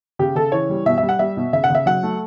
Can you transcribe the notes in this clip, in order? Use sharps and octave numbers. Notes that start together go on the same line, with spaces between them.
C#3 G4
C#3 A4
E3 C#5
G3
B2 E5
E5
G3
F#5
G3 E5
B2
C#3 E5
F#5
C#3 E5
F#3 F#5
A3